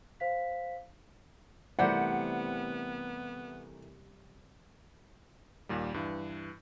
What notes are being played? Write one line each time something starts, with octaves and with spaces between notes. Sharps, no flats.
C5 F5 B6
C3 E3 G3 A3 B3 A#4 C5 F#5
D#2 A#2 G3
G2 E3